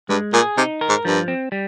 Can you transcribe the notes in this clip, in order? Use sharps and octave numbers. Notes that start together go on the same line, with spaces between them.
G2 G#3
A#2 G#4
C3 D#4
A#4
G#2
G2 F3
C4
G3